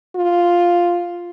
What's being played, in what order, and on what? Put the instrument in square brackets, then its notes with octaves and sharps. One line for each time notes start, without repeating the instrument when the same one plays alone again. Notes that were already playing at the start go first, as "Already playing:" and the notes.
[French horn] F4